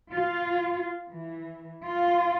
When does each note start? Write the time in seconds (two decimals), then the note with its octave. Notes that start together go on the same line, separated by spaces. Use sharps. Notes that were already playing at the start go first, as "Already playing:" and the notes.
0.12 F4
1.10 E3
1.86 F4